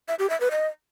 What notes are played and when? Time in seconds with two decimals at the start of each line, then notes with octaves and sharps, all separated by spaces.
0.08 E5
0.19 G4
0.30 E5
0.40 B4
0.51 D#5